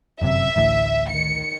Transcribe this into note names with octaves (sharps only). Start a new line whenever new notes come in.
G1 F#2 C3 E5
A1 D2 A2
D#3 C#7